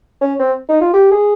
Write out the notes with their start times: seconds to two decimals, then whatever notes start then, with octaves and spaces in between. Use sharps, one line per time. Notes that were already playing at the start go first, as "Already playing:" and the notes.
0.21 C#4
0.39 C4
0.69 D#4
0.81 F4
0.94 G4
1.11 G#4